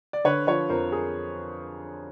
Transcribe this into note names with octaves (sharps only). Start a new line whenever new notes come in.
D5
D3 B4 C#5
F3 B4 C#5
F2 A#4 C5
G#4 A#4